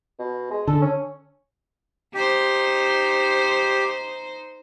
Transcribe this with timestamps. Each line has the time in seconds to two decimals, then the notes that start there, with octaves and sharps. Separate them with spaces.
0.19 B2
0.51 G#3
0.67 D3 A4
0.82 C#4
2.14 D#4 G4 C5